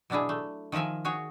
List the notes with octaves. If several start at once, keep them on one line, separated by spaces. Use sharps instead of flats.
B2 F#3 D4 E4 G#4
A3
D#3 F3 A#4 E5 G#5
F#4 G#4 C#5